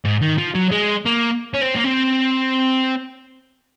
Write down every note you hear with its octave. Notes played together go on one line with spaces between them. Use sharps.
G#2
D#3
F3
F#3
G#3
A#3
C#4
C4
A#3
C4